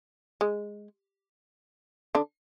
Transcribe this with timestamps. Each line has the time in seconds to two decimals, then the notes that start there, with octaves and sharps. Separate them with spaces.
0.41 G#3
2.15 D3 D4